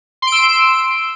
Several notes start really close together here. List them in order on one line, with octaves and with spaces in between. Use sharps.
C6 D7 E6